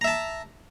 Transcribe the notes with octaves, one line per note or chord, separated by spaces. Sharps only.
E5 A5 A#5